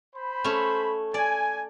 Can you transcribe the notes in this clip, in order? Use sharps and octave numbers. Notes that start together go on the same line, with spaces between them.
C5 B5
A3 C#4
D5 G#5